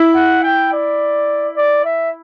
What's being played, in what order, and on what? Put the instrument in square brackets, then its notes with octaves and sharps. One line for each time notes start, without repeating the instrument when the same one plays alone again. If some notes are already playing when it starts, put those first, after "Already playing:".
Already playing: [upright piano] E4
[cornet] F#5
G5
D5
D5
E5